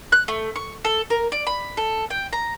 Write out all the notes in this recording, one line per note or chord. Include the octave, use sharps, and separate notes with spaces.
F#6
A3
C#6
A4
A#4
D5
B5
A4
G5
A#5